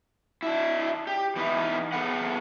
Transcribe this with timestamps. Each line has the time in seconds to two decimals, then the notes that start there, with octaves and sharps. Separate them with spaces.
0.43 D4 E4
1.07 G4
1.36 E3 B3 D#4 E4
1.92 B3 G#4 A4 B4 F#5